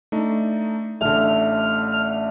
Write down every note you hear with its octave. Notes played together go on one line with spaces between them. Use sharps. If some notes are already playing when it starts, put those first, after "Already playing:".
A3 D4 D#4
A1 D3 A3 F6